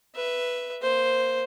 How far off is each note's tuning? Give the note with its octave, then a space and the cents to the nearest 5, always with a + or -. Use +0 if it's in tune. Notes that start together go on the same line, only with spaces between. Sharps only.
B4 +0 E5 +5
A#3 +0 C5 +0